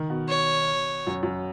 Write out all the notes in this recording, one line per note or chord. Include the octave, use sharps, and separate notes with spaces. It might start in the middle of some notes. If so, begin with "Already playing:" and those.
Already playing: D#3
B2
C#5
F#2
F#2